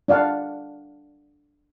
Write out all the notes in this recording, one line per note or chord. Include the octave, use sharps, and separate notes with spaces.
D4 D5 F5 F#5 A5